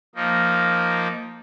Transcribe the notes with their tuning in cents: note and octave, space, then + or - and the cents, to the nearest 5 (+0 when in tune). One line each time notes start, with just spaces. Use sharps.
F3 +0 A#3 +0 D#4 +0